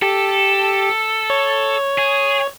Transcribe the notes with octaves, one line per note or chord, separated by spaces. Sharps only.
G4 A4
C#5
G#4